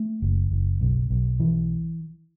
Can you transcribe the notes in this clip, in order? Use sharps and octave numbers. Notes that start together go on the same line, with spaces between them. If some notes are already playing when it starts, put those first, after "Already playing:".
Already playing: A3
F#1
F#1
B1
B1
E3